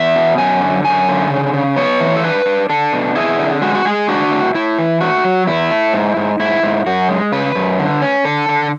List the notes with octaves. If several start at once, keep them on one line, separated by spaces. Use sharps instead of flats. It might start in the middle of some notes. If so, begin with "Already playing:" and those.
Already playing: E2 E5
B2
F#2 G#5
D3
F#2 G#5
D3
C#3
C#3
B3 C#5
E3
A4
D4 B4
D4
D4 A4
B2
E4 G#4
D3
G#3 F#4
F#4
G#3 G#4
D4 F#4
A2
A2 E4
E3
A3 F#4
F#3
E2 E4
A3
G#2
G#2
G#2 E4
G#2
F#2 F#4
G#3
C#3 B4
F#2
D3
C#4
D3 A4
D3